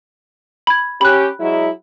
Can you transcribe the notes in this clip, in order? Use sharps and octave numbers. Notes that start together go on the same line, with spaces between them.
B5 G#6
C#4 G4 B5 F#6
F#3 G#3 E4